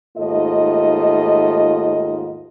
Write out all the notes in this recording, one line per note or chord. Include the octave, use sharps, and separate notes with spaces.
D#2 G#2 A3 F4 D#5